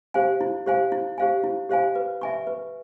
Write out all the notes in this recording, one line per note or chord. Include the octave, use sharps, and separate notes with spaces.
G4 C5 F5 G#5
E4
G4 C5 F5 G#5
E4
G4 C5 F5 G#5
E4
G4 C5 F5 G#5
B4
E5 G#5 C#6
B4